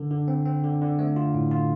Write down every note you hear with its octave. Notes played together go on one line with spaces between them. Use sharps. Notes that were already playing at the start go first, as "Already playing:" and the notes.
Already playing: D3
D3
C4
C4
D3
D3
A3
F4
A2
F4